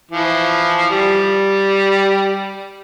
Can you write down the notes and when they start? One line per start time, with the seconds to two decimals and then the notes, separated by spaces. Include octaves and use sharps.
0.11 E3 F3
0.90 G3